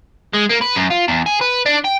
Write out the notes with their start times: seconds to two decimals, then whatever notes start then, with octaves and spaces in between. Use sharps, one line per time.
0.34 G#3
0.50 A#3
0.62 B4
0.76 F#2
0.91 F4
1.08 E2
1.26 G#4
1.41 B4
1.66 D4
1.85 G5